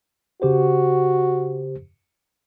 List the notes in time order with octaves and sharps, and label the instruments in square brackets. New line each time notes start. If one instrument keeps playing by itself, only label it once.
[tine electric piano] C#3 G4 C5 [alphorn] F#4